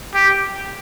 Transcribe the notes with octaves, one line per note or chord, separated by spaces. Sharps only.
G4